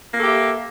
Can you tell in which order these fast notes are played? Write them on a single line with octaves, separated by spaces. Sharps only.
A#3 A4 G4 E5